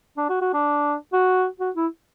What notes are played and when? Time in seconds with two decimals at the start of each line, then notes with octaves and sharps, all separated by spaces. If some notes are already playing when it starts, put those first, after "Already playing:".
0.17 D4
0.29 F#4
0.41 F#4
0.53 D4
1.13 F#4
1.59 F#4
1.76 E4